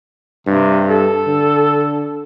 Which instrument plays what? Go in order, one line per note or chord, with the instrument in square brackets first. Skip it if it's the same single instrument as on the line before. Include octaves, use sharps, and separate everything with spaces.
[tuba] G2 [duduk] C3
[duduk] A4
[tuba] D3